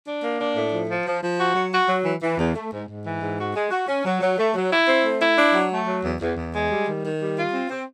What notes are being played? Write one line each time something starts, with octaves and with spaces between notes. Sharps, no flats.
D4
A#3
D4
A2
F3
F3
F3
F3
F#4
F#3
F#4
F#3
E3
E3
E2
A3
G#2
G#2
E3
G#2
F#4
G#3
F#4
C#4
F#3
F#3
A3
F#3
E4
C4
A3
E4
D4
F#3
A3
F#3
E2
E2
E2
G#3
G3
D#3
D#3
G3
F4
C4
C4